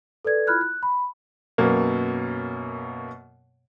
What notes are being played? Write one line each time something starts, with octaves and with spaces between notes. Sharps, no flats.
A4 B4 D5 G#6
E4 F4 B5 F6 F#6 G#6
F#6
B5
F#2 B2 A#3